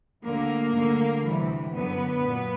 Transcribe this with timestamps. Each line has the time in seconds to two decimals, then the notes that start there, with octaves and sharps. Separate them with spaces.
0.24 D2 D3 F#3 A#3
0.74 D2 D3 G3
1.23 D2 C3 E3 G3
1.72 F#2 D3 F#3 B3
2.22 A#2 F#3